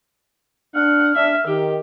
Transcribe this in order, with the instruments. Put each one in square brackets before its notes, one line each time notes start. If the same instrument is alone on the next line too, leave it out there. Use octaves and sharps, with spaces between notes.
[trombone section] D4 [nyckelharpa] F#5 [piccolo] F6
[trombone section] D4 [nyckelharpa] E5
[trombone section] D#3 [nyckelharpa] G4